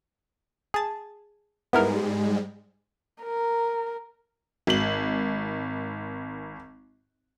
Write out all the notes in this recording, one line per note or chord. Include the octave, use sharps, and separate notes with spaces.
G#4 A5
G#2 G3 G#3 B3 E4 A#4
A#4
G#1 F#7